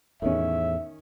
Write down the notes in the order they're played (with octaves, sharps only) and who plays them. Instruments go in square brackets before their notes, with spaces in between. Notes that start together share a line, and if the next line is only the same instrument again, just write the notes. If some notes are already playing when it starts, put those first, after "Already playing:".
[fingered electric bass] E2 A2 [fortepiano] D#3 C#4 [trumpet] E5